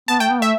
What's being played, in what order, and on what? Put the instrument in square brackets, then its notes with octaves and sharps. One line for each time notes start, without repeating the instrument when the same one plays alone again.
[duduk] B3 [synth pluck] A5
[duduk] A3 [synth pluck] G5
[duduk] B3
[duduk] A3 [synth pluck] E5